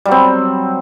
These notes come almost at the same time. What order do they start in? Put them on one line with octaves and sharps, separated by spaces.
G3 F#3 C4